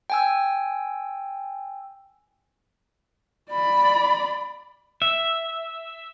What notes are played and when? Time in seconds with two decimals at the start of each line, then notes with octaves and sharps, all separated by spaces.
0.10 G5 G#5 E6
3.51 D5 B5
5.02 E5